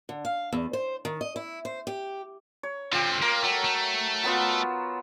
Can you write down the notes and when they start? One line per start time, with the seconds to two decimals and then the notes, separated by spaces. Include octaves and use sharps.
0.09 D3
0.25 F5
0.53 E2
0.73 C5
1.05 D#3
1.21 D#5
1.36 E4
1.65 C5
1.87 G4
2.63 C#5
2.92 D3 C4 F4 G4
3.22 A#3 A#4
3.44 F#3 A3
3.64 A3
4.24 F#3 B3 F4